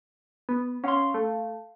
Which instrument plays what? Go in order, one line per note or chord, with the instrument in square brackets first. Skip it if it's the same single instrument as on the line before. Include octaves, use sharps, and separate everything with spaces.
[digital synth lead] B3
[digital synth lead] C#4 [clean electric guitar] F5 C6
[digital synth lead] A3